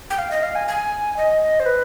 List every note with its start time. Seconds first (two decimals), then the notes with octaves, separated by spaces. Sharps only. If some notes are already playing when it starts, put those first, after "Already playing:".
0.10 G5
0.18 F5
0.31 D#5
0.43 F5
0.55 G#5
0.68 G#5
1.17 D#5
1.60 C5
1.66 B4